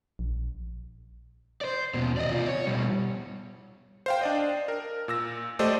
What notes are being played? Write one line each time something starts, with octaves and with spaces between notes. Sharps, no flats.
A#1
C5 D5
D#2 B2
D5 D#5
C3 F4
C#5 D5
B2 G3
C5 F5 G5
D4 D5 D#5
A#4
A#2 E6 A#6
A3 G4 A4 C5 D5 D#5